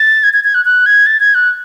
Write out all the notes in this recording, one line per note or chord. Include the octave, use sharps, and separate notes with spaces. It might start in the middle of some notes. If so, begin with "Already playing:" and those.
Already playing: A6
G#6
G#6
G#6
F#6
F#6
G#6
A6
G#6
F#6